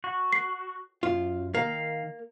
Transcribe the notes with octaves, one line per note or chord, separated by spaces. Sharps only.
F#4
C7
F#2 F4
D#3 A#3 F5